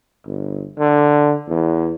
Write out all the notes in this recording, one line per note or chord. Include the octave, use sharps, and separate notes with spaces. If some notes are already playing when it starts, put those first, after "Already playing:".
G1
D3
E2